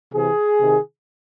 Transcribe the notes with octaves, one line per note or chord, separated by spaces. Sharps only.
C3 E3 G#4
C3 D#3